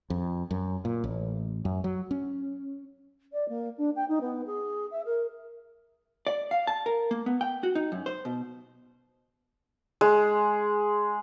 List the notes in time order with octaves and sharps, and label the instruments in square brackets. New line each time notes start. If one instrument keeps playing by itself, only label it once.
[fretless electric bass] F2
F#2
A#2
A1
F#2
F#3
C#4
[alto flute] D5
A#3
D4
G5
D#4
B3
G#4
E5
A#4
[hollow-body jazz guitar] D5
F5
A5
A#4
A#3
B3
G5
F#4
D#4
F#2
C5
B2
[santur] G#3